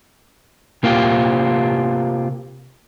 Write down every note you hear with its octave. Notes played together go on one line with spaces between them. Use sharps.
C3 A#3 C4 F4 G4